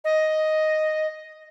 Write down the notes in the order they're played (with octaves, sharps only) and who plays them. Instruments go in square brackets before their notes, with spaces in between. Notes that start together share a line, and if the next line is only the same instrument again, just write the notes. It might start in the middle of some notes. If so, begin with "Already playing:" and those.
[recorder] D#5